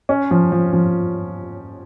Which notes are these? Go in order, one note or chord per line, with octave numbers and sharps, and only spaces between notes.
C#4
F3
F3
F3